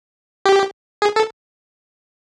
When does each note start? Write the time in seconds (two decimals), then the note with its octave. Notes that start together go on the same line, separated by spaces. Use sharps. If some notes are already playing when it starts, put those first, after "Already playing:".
0.45 G4
1.02 G#4
1.16 A4